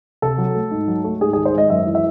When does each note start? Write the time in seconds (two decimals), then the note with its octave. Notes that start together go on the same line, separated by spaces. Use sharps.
0.22 C3 A4
0.38 F#3
0.55 A3
0.71 G#2
0.88 F#3
1.04 A3
1.20 G#2 G#4
1.33 G#4
1.37 D#3
1.45 C5
1.54 G#3 D#5
1.70 F#2 E5
1.86 E3
1.95 E5